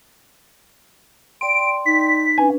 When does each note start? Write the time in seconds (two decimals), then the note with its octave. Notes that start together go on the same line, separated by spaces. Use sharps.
1.41 D5 G5 C6 D7
1.86 D#4 B6
2.38 C#4 D4 B4 G#5